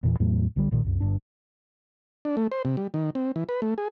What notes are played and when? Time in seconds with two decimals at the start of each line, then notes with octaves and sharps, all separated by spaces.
0.03 E1 E2 A#2 E3
0.20 E2 A2 F#3 A3
0.56 B1 D3 E3 G3
0.71 A#1 A#2 D#3
0.84 C2 F#2
1.00 G1 G2 D4
2.25 D4
2.37 A3
2.52 C5
2.65 C3
2.77 G3
2.94 D#3
3.15 C4
3.36 E3
3.49 B4
3.62 A3
3.78 G#4